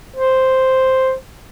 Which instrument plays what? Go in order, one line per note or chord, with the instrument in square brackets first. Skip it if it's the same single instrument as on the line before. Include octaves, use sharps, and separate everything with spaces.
[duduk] C5